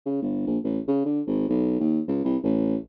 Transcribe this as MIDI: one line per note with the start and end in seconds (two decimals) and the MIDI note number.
0.06 0.21 49
0.22 0.43 31
0.47 0.58 34
0.64 0.79 33
0.88 1.00 49
1.05 1.21 50
1.27 1.48 32
1.49 1.75 35
1.80 2.00 39
2.08 2.22 37
2.24 2.37 36
2.43 2.76 33